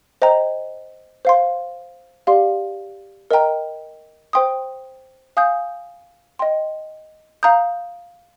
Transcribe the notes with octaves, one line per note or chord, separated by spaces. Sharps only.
C5 D#5 G5 A#5
C5 F5 C6
G4 D5 F5 C6
A#4 D#5 G5 A#5
C5 G5 C6 D#6
F5 G#5 D#6 G6
D#5 G5 C6
F5 A#5 D#6 G6